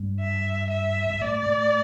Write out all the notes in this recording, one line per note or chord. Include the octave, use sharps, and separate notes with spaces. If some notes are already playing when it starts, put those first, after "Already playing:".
Already playing: G2
E5
E5
G2
A2 D5
A2